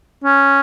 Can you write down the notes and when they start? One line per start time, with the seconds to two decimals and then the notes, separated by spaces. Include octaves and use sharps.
0.24 C#4